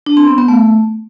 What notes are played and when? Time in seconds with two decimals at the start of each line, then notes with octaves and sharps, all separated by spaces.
0.06 D4
0.17 C4
0.27 B3
0.38 B3
0.48 A3